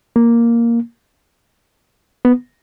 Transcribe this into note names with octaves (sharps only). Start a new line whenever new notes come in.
A#3
B3